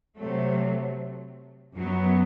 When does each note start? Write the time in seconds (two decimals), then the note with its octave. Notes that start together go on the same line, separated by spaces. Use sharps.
0.17 C3 F#3 A3
1.76 F#2 F#3 B3